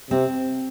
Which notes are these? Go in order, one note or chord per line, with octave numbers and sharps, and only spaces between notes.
C3 C4